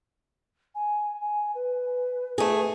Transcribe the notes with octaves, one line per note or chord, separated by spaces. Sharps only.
G#5
G#5
B4
A3 G#4